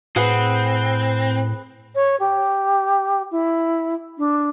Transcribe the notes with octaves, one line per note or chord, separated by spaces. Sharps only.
A2 C4 G#4 B4 F#5
C#5
G4
E4
D4